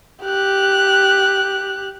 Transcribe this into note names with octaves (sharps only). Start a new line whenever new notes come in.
G4 F#6